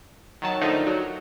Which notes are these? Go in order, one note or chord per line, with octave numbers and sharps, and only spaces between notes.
D#3 F#3 A5
D3 D#3 F3 A3 D#4
F#3